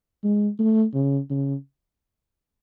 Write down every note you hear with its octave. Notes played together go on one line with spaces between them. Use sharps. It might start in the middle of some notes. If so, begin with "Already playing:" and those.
G#3
A3
C#3
C#3